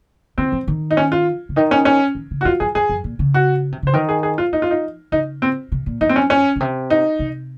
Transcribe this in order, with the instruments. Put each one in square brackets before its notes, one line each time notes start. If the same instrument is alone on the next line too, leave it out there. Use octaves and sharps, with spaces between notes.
[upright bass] D#3 [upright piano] C4
[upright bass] F3
D#3
[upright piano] D#4
C#4
F4
[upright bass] C#3
[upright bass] D#3 [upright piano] D#4
[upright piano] C#4
C#4
[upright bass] D#3
C#3
[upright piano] F#4
[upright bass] F2 [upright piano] F4
[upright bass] F#2 [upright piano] G#4
[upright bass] F#2 [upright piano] G#4
[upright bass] F#2
A#2
C#3
[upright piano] F#4
[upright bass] C3
[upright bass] C#3 [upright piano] C5
[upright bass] D#3 [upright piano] A#4
[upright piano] G#4
G#4
F4
[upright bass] F3 [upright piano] D#4
[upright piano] F4
D#4
[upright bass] C#3 [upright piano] D#4
[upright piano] C4
[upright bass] C3
A#2
[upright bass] F#2 [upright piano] D#4
[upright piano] C4
C#4
C#4
[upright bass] A#2
C3
[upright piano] D#4
[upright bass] C3